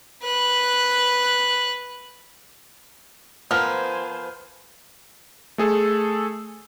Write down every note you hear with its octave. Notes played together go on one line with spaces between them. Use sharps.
B4 F#6
F3 B3 A#4 C5 G#5 F6
A3 G#4 A4